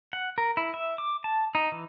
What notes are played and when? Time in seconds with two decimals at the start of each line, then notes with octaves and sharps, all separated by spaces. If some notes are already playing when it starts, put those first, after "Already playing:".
0.13 F#5
0.38 A#4
0.57 E4
0.74 E5
0.98 D6
1.24 A5
1.55 D#4
1.72 E3